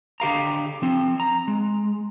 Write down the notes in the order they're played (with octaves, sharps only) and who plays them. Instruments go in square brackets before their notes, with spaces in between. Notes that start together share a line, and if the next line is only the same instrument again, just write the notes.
[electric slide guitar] D3 G4 F5 A#5
F3 C4
A#5
G#3